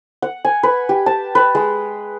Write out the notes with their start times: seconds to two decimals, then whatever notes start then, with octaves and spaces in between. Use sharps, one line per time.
0.22 F#5
0.45 G#5
0.63 B4
0.89 G4
1.06 A5
1.35 B4
1.55 G#3